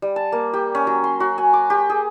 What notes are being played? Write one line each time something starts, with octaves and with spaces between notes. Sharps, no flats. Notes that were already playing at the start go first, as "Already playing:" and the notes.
G3
A5
A#3
G4
C#4
F#3
C6
F#4
G#5
D6
G4
G#4